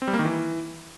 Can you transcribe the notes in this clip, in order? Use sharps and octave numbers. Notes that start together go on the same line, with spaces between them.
C4
G3
A#3
D#3
E3